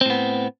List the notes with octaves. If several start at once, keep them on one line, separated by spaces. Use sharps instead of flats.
A2 B3 C4